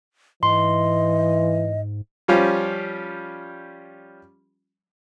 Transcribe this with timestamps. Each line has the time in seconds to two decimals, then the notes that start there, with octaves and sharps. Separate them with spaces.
0.43 G#2 E3 D#5 C6
2.28 F3 G3 C#4 F4 G4